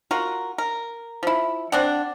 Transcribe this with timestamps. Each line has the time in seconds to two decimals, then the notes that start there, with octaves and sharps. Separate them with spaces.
0.11 F4 F#4 A#4
0.58 A#4
1.23 F3 E4
1.72 C4 D4 F#5